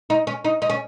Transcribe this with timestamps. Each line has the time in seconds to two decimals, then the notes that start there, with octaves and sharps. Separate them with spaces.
0.10 D#4
0.27 C#4
0.44 D#4
0.62 D#4
0.70 C#4